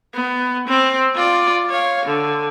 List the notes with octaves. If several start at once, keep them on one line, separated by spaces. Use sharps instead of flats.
B3
C4
F4 D5
C#5 F5
D3